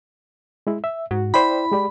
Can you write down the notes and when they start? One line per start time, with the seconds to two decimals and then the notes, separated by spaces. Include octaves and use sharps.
0.67 G#3 E4
0.84 E5
1.11 G#2 F#4
1.34 E4 C5 D5 G5 B5
1.72 G#3 G4 D5